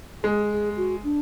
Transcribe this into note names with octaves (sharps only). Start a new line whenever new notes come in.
G#3 G#4
G#4
F#4
D4